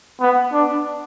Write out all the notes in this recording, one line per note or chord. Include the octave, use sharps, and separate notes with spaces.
B3
D4